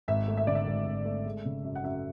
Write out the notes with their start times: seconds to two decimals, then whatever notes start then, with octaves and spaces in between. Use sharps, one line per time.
0.08 G#1 E5
0.28 A3
0.37 E5
0.47 D3 D5
0.55 E5
0.67 G#1
0.87 G#1
1.05 A3
1.26 G#3
1.45 C#3
1.64 F#2
1.75 F#5
1.84 F#2 E5